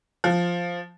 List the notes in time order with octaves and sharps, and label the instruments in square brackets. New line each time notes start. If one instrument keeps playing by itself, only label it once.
[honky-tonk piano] F3